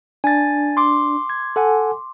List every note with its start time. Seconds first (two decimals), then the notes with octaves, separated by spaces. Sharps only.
0.24 D4 G#5 A6
0.77 C6 D6
1.30 G#6
1.56 A4 F#5 G#5